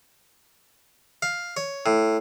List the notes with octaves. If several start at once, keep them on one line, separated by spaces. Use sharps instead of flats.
F5
C#5
A2